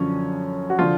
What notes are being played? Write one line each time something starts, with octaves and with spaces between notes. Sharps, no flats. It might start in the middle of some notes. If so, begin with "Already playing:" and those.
Already playing: F#2 D3 F3 C#4
F#4
D3 F3 F4